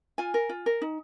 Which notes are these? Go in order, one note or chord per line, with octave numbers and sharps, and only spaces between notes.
F4 G#5
A#4
F4
A#4
D#4